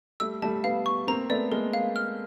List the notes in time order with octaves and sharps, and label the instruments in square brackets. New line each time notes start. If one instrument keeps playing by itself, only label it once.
[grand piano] G3 A3 [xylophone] E6
[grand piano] G3 A3 [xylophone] A5
[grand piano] A3 B3 [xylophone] F5
[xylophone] C#6
[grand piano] A#3 C4 [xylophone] A#5
[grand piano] A3 B3 [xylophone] D5
[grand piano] G#3 A#3 [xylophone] A#4
[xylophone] F5
F6